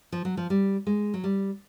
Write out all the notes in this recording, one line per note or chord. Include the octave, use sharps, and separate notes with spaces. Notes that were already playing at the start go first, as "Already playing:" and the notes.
F3
F#3
F3
G3
G#3
F#3
G3